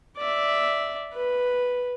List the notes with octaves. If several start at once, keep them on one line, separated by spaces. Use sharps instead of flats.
D5 E5
B4